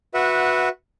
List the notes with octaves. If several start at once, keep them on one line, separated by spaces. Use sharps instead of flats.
F#4 B4 E5 F#5